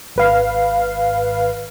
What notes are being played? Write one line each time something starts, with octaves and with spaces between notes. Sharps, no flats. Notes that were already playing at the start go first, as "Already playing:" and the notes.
G#1 B4 F5